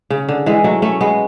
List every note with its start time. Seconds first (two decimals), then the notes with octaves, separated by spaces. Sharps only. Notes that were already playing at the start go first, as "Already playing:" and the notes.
0.10 C#3
0.29 D3
0.46 E3 G#3
0.64 F#3 A3
0.82 A3 C#4
1.01 G#3 B3